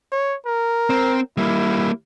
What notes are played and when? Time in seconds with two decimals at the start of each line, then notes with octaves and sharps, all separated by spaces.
0.12 C#5
0.46 A#4
0.90 C4
1.37 G3 A#3 E4